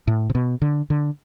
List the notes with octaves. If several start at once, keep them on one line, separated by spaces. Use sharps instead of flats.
A2
C3
B2
D3
D3